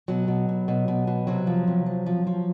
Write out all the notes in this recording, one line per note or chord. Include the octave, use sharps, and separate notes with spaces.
B2 F#3
B2
B2
B2
B2
B2
C3 F#3
F3
C3
F3
F3
F3